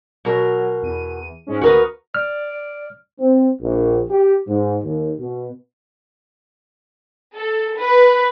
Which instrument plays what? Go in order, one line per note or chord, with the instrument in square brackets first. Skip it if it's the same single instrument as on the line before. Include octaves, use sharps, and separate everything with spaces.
[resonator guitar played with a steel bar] B2 A#4 [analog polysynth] F#3
[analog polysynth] E2 D#7
G#2 G#3 C#4
[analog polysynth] D2 A#3 D#6 [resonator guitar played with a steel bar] F#4 A#4 B4
[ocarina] D5 [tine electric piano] F6
[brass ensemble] C4
A#1
G4
G#2
D#2
B2
[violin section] A4
B4